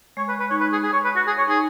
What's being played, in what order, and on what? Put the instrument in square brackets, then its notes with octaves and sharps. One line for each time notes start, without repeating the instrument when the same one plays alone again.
[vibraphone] G#3 [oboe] C#5
[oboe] B4
B4
[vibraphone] D#4 [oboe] C#5
[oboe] B4
G#4
G#4
C#5
B4
F#4
G#4
C#5
[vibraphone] D#4 [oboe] G#4